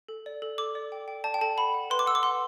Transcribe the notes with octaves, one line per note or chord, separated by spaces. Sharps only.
A4
D5
A4
A4 D6
D5
G5
G5
D5 A5
G5
A4 A5
F#5 B5
F#5
B4 C6
D6
F#5 E6
D6
F#5 C6